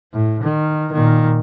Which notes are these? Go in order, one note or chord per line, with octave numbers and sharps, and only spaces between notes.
A2
D#3
A#2 D#3